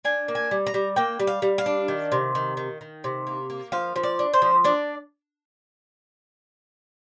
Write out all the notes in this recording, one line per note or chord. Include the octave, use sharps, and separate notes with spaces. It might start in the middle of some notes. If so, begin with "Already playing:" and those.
D4 G#5
A#3
G#5
G3
A#5
G3
A#3 G5
G3
F5
G3
F5
D4
D#3
C3
D#3
D#3
D#3
C3
A#3
A#3
F3 F5
F3
D5
D4
C5
F3
D4 D5